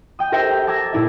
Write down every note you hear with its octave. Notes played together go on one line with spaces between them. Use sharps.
G5 D#6
G4 A#4 C5 E5 G5
A5 D6 E6 G#6 A#6
A#2 E4 E5